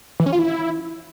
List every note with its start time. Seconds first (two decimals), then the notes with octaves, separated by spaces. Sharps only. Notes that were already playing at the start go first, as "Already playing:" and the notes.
0.20 E3
0.26 C#4
0.32 F4
0.39 E4